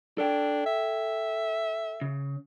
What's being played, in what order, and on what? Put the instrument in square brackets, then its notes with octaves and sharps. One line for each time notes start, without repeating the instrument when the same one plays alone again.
[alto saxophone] D4 [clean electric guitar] A4 G5
[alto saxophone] E5
[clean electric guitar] C#3